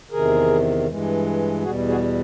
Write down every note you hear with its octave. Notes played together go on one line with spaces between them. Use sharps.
E2 C3 D#3 G#4 A#4
G2 E3 G#3
E2 B2 G3 F#4 G#4
F#4 G#4